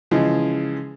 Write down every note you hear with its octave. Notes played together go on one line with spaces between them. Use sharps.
C#3 E3 F3 G#3